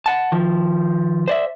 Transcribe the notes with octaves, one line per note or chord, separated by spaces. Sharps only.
F#5 A5
D#3 F3
C5 D5 E5